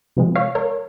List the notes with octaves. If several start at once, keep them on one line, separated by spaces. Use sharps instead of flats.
C3 F3 G#3
C#5 F5
A#4 C#5